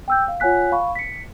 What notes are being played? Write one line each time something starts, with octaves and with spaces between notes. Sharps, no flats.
G5 E6 G6
F5
F4 C#5 F#5 G#5 F#6 B6
F5 B5 C#6
B6 C#7